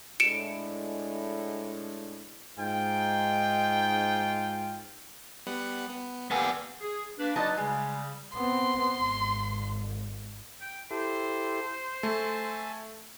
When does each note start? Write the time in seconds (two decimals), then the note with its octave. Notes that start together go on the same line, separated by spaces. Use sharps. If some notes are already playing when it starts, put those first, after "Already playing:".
0.20 A2 G#3 D4 C#7 D7 E7
2.57 G#2 D#4 F4 G5
5.47 G3 B3 F#5
5.89 B3
6.31 A#3 B3 G4 G#5
6.81 G#4
7.19 A#3 D4 B4
7.36 F#3 D#4 B4 D5 D#5 A5
7.57 C#3 G3 G#3
8.36 B3 C4 C6
8.98 G#1
10.61 G5
10.91 E4 G4 A4 C5
12.03 A3 E5 G#5 A5